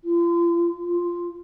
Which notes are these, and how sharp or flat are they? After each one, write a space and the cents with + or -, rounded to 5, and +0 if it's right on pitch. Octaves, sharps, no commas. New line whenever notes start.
F4 -40
F4 -5